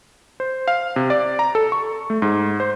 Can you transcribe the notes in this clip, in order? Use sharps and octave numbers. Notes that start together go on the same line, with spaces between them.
C5
F5
C3
D5
A#5
A4
C#6
A3
G#2
C5